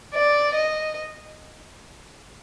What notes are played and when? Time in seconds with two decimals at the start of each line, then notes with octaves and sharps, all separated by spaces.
0.14 D5
0.55 D#5